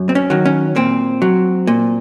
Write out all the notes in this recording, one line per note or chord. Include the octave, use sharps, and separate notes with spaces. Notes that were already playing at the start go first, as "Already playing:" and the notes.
Already playing: F#2
C4
C#4
D#3 F#3
C#4
A#2 C4
F#3
A#2